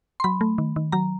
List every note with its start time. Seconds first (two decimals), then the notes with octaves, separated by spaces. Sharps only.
0.20 C6
0.24 F#3 B5
0.41 A3
0.58 D#3
0.76 D#3
0.92 F#3 A#5